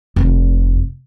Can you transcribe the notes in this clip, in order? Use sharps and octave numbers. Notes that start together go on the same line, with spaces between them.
F1 F2